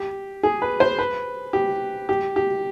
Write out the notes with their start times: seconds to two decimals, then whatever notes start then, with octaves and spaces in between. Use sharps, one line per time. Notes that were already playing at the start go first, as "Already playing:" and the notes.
Already playing: G4
0.43 G#4
0.62 B4
0.80 C5
0.99 B4
1.53 G4
2.09 G4
2.36 G4